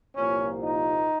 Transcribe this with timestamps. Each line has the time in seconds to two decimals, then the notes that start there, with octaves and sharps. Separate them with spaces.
0.16 C2 A#2 F3 A#3 C#4
0.63 D#4